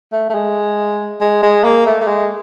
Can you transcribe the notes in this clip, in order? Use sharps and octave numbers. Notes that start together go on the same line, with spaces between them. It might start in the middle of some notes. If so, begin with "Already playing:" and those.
A3
A3
G#3
G#3
G#3
A#3
A3
A3
G#3